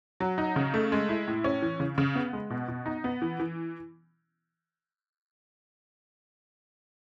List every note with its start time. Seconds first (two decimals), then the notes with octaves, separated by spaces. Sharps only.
0.20 F#3
0.38 D#4
0.56 C#3
0.74 A3
0.92 G#3
1.09 E4
1.28 A2
1.44 C#4
1.62 E3
1.80 C#3
1.98 C#3
2.15 B3
2.33 G#3
2.50 B2
2.68 B2
2.86 D#4
3.04 B3
3.22 E3
3.40 E3